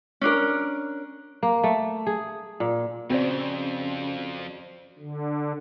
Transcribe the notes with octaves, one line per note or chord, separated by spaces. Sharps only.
C#4 D4 A#4
A#3
A3
G#4
A#2
F2 C#3 C4 F#4 C5 D5
D3